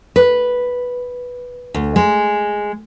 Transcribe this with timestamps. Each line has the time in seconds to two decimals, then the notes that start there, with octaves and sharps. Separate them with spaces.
0.16 B4
1.74 D2
1.96 G#3